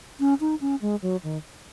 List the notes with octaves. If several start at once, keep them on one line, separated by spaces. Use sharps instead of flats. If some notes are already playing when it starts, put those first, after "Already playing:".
C#4
D#4
C#4
G#3
F#3
D#3